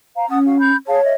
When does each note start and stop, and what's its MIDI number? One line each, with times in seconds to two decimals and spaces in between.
0.16 0.26 72
0.16 0.26 77
0.16 0.26 82
0.29 0.70 61
0.29 0.39 78
0.29 0.39 81
0.29 0.39 87
0.45 0.56 66
0.45 0.56 77
0.60 0.77 83
0.60 0.77 91
0.87 1.00 68
0.87 1.13 73
0.87 1.00 77
0.87 1.00 81
1.03 1.14 75
1.03 1.14 76